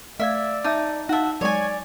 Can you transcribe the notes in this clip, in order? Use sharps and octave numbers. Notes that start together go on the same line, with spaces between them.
A3 D5 E5 F5 G#6
D#4 E5 A5 D6
D#4 F#4 E5 F5 A5
F#3 G#3 C#5 D5 G#5